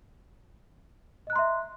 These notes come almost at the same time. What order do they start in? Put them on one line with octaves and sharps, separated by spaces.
D#5 F#6 A#5 C6 E5